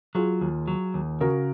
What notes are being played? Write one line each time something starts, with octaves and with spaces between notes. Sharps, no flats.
F#3 F4 G#4
D#2
F#3
D#2
C#3 F#4 A#4